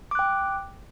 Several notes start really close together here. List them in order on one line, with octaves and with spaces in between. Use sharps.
D6 F#6 G5